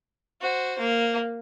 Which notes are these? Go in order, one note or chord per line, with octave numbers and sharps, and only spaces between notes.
F#4 C5
A#3